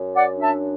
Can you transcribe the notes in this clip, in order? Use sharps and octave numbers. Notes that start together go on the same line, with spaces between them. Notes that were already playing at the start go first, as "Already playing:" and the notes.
Already playing: F#2
D5 F#5
D4
E5 A5